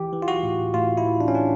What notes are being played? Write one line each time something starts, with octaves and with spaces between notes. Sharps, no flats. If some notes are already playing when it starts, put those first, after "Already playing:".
Already playing: E3 G4
E3
F4
F#4
A2
A2 F4
E4
E3
D4
C#4
E3 D4